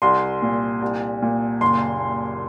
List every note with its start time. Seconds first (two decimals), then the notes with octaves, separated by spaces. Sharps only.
0.02 C2 C6
0.42 A#2
0.82 C2
1.22 A#2
1.61 F#1 C6